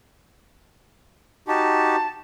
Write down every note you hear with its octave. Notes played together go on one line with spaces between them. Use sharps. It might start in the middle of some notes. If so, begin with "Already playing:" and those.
D#4 F#4 G4 A5